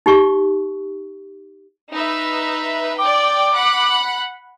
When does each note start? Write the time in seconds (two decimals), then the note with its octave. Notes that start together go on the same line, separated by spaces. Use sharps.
0.06 D#4 G4 C#6
1.92 D#4 B4 E5
2.98 D5 G5 D6
3.55 F#5 B5 F#6